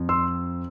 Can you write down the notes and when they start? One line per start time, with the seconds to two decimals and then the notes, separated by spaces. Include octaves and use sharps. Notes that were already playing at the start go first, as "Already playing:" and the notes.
Already playing: F2 F3 C4
0.09 C6 E6